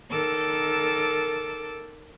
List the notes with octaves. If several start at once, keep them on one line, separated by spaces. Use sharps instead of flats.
D#3 A4 A#4 D6 E6